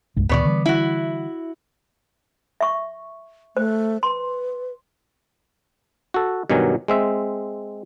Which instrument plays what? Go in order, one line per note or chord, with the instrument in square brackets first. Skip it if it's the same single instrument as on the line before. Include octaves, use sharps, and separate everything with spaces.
[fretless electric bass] C2 G2 G#3
[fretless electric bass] D2 A#2 D#3 [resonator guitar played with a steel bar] B3 C#5 D5
[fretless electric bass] D3 E3 G3
[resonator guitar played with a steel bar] E4 F#4
[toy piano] E5 C#6
[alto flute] A3 [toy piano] C5
[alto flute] B4 [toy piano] C6
[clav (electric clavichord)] F#4 A4
G2 B2 D#3 F#3 G#5
G#3 C4 E5